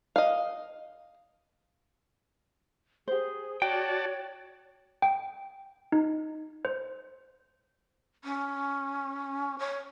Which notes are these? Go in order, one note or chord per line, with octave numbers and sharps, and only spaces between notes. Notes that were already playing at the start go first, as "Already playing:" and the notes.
D#5 F5
G4 G#4 C5
F#4 C#5 D5 G5 A5
G5
D#4
C5
C#4
C#5